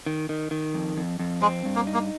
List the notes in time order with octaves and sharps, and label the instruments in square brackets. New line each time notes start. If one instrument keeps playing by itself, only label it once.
[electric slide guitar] D#3
D#3
D#3
F2
F2
F2
[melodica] G#3 [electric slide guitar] C4
[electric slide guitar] G2
[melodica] A#3
[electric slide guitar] D#4
[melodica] A#3